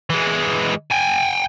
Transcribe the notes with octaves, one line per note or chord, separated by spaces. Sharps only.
E3 G#3
G5 G#5